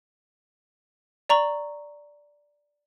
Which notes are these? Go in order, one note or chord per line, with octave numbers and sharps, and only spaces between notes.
D5 A#5 C#6 F#7